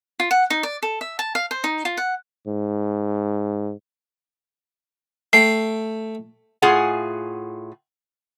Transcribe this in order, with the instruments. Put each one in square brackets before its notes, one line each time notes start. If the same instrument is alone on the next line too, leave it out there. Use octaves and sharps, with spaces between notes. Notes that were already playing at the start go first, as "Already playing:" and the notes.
[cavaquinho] F4
F#5
D#4
D5
A4
E5
A5
F5
C5
D#4
F4
F#5
[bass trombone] G#2
[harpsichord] A3 G5 [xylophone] C7
[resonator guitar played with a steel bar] A2 F4 G#4 F#5 G#5